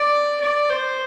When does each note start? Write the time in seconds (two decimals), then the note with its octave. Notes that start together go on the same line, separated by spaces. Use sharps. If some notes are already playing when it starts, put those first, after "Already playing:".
Already playing: D5
0.41 D5
0.70 C5